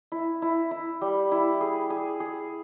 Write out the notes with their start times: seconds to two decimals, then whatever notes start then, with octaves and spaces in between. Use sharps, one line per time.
0.12 E4
0.42 E4
0.71 E4
1.01 G3
1.32 E4
1.61 G#4
1.90 G#4
2.20 G#4